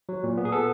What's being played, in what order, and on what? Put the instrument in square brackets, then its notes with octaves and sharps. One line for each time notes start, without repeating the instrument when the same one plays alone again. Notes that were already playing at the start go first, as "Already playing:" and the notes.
[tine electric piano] F#3
A#2
B3
G#4
B3 A4